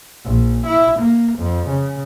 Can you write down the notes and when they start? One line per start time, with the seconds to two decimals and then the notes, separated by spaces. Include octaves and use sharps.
0.25 A#1
0.66 E4
0.99 A#3
1.38 F2
1.68 C#3